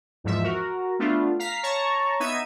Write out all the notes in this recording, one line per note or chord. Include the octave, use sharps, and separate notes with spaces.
E2 G#2 F3 E5
F#4 A#4
A3 B3 D4 F4
F5 A#5 B6 C7
C#5 A5 A#5 C#6
B3 D#4 E5 G#6 D#7